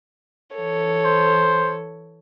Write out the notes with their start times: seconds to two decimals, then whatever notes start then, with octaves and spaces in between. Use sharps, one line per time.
0.54 E3 A4 C#5
1.05 C5